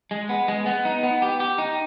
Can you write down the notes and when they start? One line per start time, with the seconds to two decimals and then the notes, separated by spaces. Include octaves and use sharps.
0.11 G#3
0.29 B3
0.48 G#3
0.66 B3
0.85 D#4
1.03 B3
1.22 G4
1.40 G4
1.58 D#4